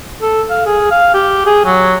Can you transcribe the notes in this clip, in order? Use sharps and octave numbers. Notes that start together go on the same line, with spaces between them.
A4
F5
G#4
F5
G4
G#4
F#3